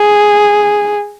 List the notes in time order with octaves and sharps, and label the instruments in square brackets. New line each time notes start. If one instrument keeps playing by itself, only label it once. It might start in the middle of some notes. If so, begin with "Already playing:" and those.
Already playing: [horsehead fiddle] G#4